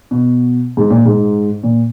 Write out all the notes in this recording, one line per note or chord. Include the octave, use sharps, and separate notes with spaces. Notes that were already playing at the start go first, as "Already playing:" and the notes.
B2
G#2
A#2
G#2
A#2